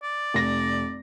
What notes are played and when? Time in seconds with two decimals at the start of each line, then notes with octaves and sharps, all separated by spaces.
0.03 D5
0.34 F1 A#6